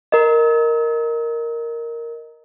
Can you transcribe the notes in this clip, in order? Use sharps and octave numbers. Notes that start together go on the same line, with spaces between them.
A#4 D#5